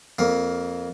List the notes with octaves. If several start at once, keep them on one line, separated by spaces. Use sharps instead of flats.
F2 A#3